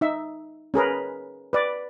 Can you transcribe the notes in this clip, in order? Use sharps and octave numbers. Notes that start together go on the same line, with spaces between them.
D#4 E5
C#4 G#4 A#4 B4
B4 D5